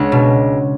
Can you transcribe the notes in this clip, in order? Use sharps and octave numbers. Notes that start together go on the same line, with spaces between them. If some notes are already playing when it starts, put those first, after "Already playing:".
Already playing: C#2 G#3 D4 F#5
B2